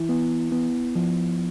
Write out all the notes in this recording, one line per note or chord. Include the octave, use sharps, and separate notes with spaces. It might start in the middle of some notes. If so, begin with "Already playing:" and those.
Already playing: E3 E4
B3
B3
F3